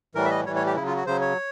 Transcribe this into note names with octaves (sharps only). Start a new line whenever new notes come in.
A2 E3 G3 A#4
E5
D#5
A2 E3 G3 C#5
C#5
G4
C#3 F#3 E4
F4
F#4
C#3 F#3 C5
C#5